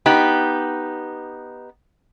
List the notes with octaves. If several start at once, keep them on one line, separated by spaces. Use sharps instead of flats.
B3 D#4 G4